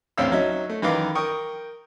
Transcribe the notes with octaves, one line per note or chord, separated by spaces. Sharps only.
A1 D2 C4 C#4 F5 E6
F#3 C#4 D#4 E5
A3
F#2 D#3 E3 B4 F5 D6
A#4 G5 C#6 D#6